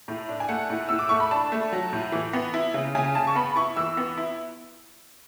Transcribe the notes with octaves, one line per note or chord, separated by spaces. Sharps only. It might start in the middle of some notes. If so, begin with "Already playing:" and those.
A2
D4
G#5
A3 F#5
A2
A2 E6
D6
A3 C#6
B5
D4 A5
A3
F#3
A2
E3
B3
E4
C#3
C#3 G#5
C#3 A5
C#6
B3 B5
E4 C#6
E3 E6
B3
E4